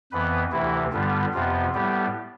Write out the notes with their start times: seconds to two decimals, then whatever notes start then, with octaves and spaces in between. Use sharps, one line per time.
0.12 F2 E3 B3 B4
0.51 D2 C3 E3 E4
0.92 G2 D3 G3 B3 F4
1.33 F2 C3 F3 B3 F4
1.74 A2 G3 B3 G4